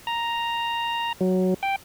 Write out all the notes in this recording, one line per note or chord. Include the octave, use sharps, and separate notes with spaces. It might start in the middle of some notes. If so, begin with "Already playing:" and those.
A#5
F#3
G5